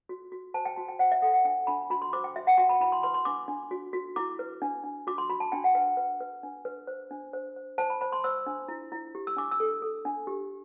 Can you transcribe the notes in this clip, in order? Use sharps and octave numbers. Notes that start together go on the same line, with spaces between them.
F#4
F#4
C5 A5
G5
F#4 A5
G5
C5 F#5
E5
A4 F#5
F#5
D4 G5
D4 B5
F#4 B5
C6
C5 D6
G5
F#4 E5
F#5
F#4 G5
B5
E4 B5
C6
B4 C6
C6
D4 D6
D4
F#4
F#4
E4 D6
B4
D4
D4
F#4 D6
C6
F#4 B5
A5
D4 G5
F#5
B4 G5
B4
B4
D4
B4
C5
D4
C5
C5
C5 A5
B5
C5 B5
C6
C5 E6
D4
E4
E4
G4
E6
D4 D6
E6
A4
A4
D4
G4